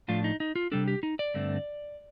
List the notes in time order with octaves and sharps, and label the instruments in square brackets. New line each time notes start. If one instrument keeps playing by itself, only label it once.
[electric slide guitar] A2 F3 A3 D4 F4
D#4
D#4
F4
C3 G3 D4 A4
G4
D#4
D5
G2 D3 A3 C4